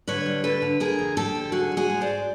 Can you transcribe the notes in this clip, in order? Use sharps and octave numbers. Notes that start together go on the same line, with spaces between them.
D3 B4 C#5
G3
D3 A4 B4
D3
D3 G#4 A#4
F2
F2 G4 A4
D3
G#2 F#4 G#4
G#3
F#4 G#4
G#3
C5 D5
G#2